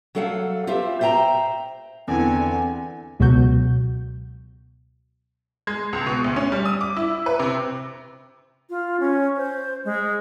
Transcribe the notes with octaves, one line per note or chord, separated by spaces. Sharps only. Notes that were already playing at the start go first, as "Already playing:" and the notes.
F#3 A3 A4 F5 F#5
F4 G4 B4 C5 E5
C5 E5 G5 A5 A#5
E2 D3 C4 G#5
C#2 B2 F#3 F#4 G6
G#3
C#2
B2
D2
C#4
G3
D#6
D6
E4
B4
C3
F4
C#4
C5
G#3